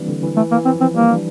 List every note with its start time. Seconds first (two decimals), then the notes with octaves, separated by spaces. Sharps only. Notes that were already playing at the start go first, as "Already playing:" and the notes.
Already playing: E3 G3 A#3 C4 D4
0.09 D3
0.23 E3
0.37 E3 A3
0.51 A#3
0.57 E3
0.65 C4
0.75 F3
0.81 C4
0.94 G3 A#3
1.09 D4